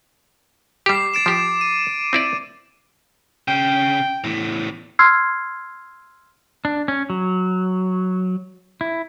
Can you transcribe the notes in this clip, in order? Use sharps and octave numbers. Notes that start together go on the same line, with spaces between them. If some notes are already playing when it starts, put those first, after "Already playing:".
G3 G4 D6 C7
A6 D7 E7
F3 G4
D#7
C4 E4 D5
C#3 G5
E2 A2
C6 E6 F6 G#6 C7
D4
C#4
F#3
E4